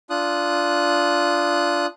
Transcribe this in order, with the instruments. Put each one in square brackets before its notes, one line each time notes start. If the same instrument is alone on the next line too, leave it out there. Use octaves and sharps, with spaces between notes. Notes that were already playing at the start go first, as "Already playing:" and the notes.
[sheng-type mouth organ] D4 F4 D#6 F#6